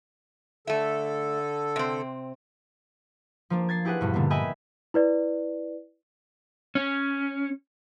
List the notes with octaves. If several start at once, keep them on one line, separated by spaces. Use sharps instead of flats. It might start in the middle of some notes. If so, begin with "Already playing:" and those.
D3 A3 A4 E5
C3 C4
F3 A#3 D4
G#6 A6 C7
E4 G4 G#4 B4 F#5
E2 G2 B2
A#2 D3 G3 A#3 B3
D#5 E5 G5 G#5 B5 E6
E4 B4 D5
C#4